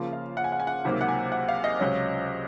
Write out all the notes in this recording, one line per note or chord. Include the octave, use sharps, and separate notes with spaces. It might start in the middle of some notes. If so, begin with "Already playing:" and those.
Already playing: C#3 F3 A#3 F4
F5
F#5
G#5
F#5
G#5
F#5
C#2 C3 D#3 F#3 A#3
F#5
G#5
F#5
F5
D#5
C#2 C3 F#3 C#4